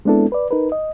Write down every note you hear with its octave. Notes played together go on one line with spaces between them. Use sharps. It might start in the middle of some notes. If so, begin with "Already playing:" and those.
G#3 B3 C4 D4 E4 A4
B4 D5
D#4 A#4 B4
D#5